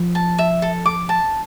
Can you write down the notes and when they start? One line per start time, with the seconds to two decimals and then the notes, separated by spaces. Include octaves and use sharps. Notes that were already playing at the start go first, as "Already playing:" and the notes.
Already playing: F3
0.15 A5
0.38 E5
0.62 A4
0.86 D6
1.09 A5